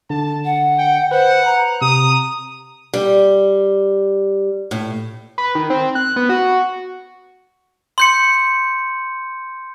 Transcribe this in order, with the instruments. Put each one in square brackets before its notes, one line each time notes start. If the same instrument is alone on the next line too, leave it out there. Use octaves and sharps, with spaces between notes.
[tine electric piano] D3 [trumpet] A5
[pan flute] F#5
[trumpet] G5
[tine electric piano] B4 [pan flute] C5 [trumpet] F#5
[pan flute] A#5
[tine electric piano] C3 [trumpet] D#6
[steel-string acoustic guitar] G3
A2
[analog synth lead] B4
D#3
C4
F#6
B3
F#4
[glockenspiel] C6 G6 C#7